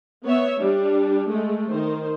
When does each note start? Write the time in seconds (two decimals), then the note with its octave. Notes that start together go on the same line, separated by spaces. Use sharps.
0.24 B3 C#5 E5
0.59 G3 D4
1.28 G#3 A3
1.68 D#3 C5